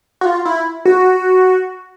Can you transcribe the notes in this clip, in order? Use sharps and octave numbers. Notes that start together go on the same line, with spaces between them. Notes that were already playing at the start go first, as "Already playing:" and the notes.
F#4
F4
E4
F#4